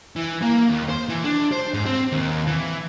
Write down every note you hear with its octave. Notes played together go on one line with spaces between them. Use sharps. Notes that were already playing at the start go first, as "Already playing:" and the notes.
E3
A#3
D#2
C5
E3
D4
C5
G#2
C4
D#2
E3